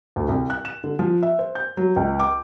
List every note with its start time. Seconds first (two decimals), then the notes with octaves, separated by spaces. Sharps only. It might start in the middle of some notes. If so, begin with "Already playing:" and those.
0.16 D2
0.29 C2
0.50 F#6
0.65 E7
0.84 D3
0.99 F3
1.23 E5
1.39 C5
1.55 G6
1.77 F#3
1.96 C#2
2.19 D6